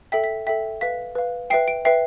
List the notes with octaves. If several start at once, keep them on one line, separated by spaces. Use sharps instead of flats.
A4 E5 G5 B6
B6
A4 E5 G5 B6
B4 F5 B6
B4 F5
B4 E5 G5 C7
D7
B4 E5 G5 C7